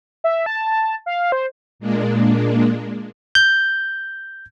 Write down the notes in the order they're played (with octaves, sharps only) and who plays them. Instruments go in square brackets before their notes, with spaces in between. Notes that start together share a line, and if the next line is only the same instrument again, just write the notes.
[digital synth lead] E5
A5
F5
C5
[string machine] A#2 G#3 A#3 D4
[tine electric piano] G6